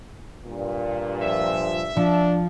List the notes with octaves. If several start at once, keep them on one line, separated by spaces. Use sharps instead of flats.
G2 A#2
F3 E5
F3 D4